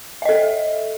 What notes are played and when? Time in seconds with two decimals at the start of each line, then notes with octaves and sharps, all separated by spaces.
0.22 E5
0.25 D#5
0.29 A4